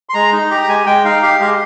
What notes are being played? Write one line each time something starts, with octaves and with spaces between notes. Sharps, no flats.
C6
G#3 A#5
D#4
G4 A#5
A#5
G#3 G#5
G#3 G5
D#4 F5
G4 F5
G#3 F5